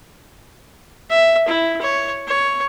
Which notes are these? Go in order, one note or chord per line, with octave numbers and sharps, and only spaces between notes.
E5
E4
C#5
C#5